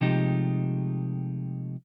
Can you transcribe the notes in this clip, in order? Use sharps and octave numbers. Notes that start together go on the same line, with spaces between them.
C3 F3 G#3 A3 D#4 G4